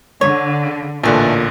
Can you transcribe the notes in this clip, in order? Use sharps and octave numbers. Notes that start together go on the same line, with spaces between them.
D3 C#5
A1 A#2 D3 E3 A3